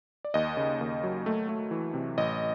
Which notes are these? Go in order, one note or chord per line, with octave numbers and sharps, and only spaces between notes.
D5
D#2 D#5
C#3
D#2
F#3
A3
A3
E3
C3
A1 D#5